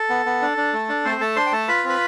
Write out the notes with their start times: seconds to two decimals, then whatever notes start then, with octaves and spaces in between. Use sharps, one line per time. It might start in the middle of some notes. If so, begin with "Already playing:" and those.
Already playing: A4
0.10 B3
0.26 B3
0.42 D4
0.57 D4
0.74 A3
0.89 D4
1.05 A3 C4 C5
1.21 A3 A4 A5
1.36 D4 C5 C6
1.46 G5
1.52 A3 A4 A5
1.68 F4 B4 B5
1.84 C4 B4 B5